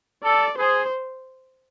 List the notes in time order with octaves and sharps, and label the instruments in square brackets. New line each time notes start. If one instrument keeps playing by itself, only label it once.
[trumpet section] A4 [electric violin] D5
[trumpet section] G#4 [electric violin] C5